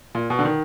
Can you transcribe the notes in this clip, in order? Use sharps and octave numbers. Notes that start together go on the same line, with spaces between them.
A#2
B2
D3
D#3